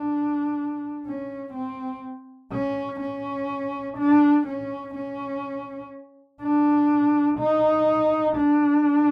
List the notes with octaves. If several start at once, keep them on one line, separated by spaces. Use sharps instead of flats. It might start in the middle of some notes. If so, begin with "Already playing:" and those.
Already playing: D4
C#4
C4
C#4
C#4
D4
C#4
C#4
D4
D#4
D4